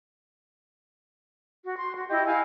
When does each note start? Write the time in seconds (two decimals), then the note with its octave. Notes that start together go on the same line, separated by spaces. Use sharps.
1.65 F#4
1.77 C6
1.97 F#4
2.09 E4 G4 D#5
2.26 E4 F5 G#5